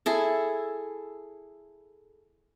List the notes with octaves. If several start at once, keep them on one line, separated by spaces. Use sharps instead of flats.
E4 G#4 A4